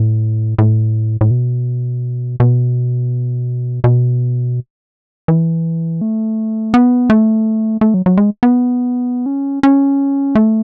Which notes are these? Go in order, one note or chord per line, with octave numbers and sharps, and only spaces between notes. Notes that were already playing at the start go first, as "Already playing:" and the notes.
Already playing: A2
A2
A2
B2
B2
B2
E3
A3
B3
A3
A3
F#3
F#3
G#3
B3
C#4
C#4
A3